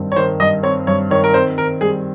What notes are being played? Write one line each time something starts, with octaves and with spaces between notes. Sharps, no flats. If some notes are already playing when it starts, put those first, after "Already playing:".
Already playing: G2 D#3 C4
C#5
D#3 C5
G2 D#5
C4 C#5
G2 C#5
D#3 C#5
A#4
C4 C5
D#3 A#4
G3 G#4